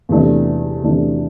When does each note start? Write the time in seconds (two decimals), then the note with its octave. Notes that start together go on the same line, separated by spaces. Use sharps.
0.09 E2 C3 E3 A3 D4
0.83 E2 C3 E3 A3 D4